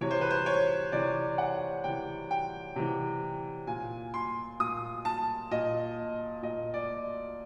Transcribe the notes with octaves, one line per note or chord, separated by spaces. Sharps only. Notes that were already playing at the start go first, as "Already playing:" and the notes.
C3 E3 C#5
C5
B4
C5
C#5
C3 E3 D5
F#5
C3 E3 G5
G5
C3 E3
A#2 G#5
C6
A#2 D#6
A5
A#2 D#5
A#2 D#5
D5